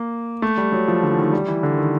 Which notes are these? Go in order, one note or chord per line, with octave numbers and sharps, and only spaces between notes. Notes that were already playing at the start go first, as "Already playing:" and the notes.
Already playing: A#3
A3
G3
F#3
F3
D3
E3
D#3
G3
E3
D3
D#3